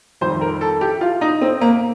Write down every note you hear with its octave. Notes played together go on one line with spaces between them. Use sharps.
F2 D#3 G3 C5
A#4
A4
G4
F4
D#4
C4
A#3